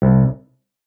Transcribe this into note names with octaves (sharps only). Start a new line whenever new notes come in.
C2